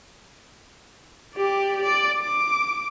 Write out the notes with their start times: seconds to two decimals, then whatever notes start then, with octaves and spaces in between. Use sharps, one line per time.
1.36 G4 D5
1.83 D5
2.21 D6